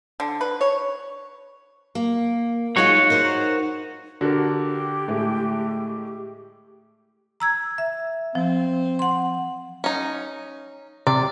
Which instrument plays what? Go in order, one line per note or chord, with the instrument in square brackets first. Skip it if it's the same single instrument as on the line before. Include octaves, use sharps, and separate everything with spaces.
[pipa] D3
B4
C#5
[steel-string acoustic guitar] A#3
[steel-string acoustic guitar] G#3 D#4 F4 [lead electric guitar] F#4 C#5
[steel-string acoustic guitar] D#4 A#4 C5
[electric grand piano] D3 D4 [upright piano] F#4 A#4 [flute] G4
[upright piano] A2 G#3 A3
[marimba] A#5 E6 G#6
E5
[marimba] F3 [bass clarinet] C4
[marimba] F#5 C6
[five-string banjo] C#4 D#4
[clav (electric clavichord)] C3 [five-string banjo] D5